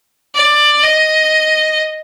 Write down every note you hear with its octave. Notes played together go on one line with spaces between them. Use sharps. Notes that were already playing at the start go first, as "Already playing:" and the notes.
D5
D#5